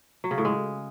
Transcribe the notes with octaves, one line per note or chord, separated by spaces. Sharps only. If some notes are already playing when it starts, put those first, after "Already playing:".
F#3
C#3
A2
G#3